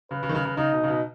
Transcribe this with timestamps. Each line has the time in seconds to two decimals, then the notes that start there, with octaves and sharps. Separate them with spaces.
0.11 C#3 B4
0.23 C#3
0.29 D#3
0.35 C#3
0.45 C#3
0.57 C#3 D#4
0.72 B2
0.84 C#3
0.88 B2